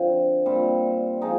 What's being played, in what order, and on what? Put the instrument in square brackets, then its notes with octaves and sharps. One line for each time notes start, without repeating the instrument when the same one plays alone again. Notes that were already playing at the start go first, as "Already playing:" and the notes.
Already playing: [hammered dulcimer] D3 F3 C4
A#2 G3 C4
F3 G#3 D#4 G#4